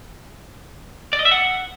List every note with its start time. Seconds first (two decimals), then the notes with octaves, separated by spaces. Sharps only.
1.13 D5
1.19 D#5
1.25 E5
1.32 F#5